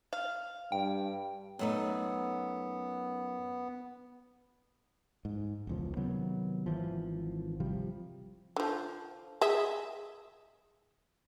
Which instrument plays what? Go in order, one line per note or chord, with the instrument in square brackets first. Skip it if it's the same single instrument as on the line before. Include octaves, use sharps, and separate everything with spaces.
[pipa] F5
[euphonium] G2 [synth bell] G5
[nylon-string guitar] F#2 A3 D#4 [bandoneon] B3
[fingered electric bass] G#2
E1 C#2 F3
C3 D#3 F#3 B3
G#1 E3 F3
C3 F3 G3
[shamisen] D3 F3
G#4 D#5 E5